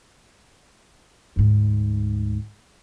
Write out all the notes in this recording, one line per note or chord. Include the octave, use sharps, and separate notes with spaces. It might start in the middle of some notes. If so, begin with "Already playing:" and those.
D2 G#2